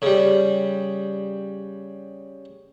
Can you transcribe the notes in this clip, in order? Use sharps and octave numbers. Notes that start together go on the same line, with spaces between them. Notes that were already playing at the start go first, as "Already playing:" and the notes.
C#3 G3